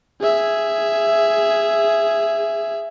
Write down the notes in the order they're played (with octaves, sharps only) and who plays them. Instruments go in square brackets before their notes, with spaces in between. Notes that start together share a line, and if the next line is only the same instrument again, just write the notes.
[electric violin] G#4 E5